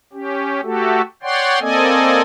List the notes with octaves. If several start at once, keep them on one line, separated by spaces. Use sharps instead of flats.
C#4 G4
A3 F#4 G4 A4
C#5 D5 F#5 G5 C6
A#3 C4 A4 D5 D#5 G#5